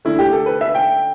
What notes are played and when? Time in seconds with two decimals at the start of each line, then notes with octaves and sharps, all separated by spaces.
0.05 D3 A3 E4
0.19 G4
0.33 A4
0.46 B4
0.61 E5
0.75 G5